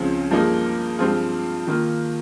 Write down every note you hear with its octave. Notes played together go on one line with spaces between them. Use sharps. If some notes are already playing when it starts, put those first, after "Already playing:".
Already playing: C#2 C#3 F3 C4
G2 F3 A#3 D#4 G#4
G2 F3 C4 F4 G#4
D#3 A#3 F4